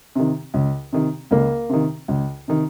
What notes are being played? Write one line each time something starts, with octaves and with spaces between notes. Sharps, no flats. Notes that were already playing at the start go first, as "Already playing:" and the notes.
C3 D#3
C#2
C3 D#3
C#2 A#3
C3 D#3
C#2
C3 D#3